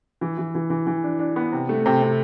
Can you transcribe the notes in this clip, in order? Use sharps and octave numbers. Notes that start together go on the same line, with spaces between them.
E3
E3
E3
E3
E3
D4
D4
B3
C3
A3
C3
C3